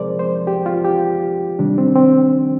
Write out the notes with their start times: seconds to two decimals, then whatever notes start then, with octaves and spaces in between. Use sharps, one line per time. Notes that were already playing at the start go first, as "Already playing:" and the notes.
Already playing: C3 F3 G#3 G#4 A#4 C5 D5
0.19 C5
0.47 G4
0.66 F4
0.85 G4
1.59 C3 D#3 G3 D4
1.78 C4
1.96 C4